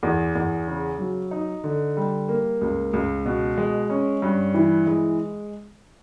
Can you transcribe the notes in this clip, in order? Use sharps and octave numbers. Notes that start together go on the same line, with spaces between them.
E2
E2
C#3
F#3
D#4
D3
G3
A#3
C#2
C#2
B2
G#3
C#4
G2
E3
G#3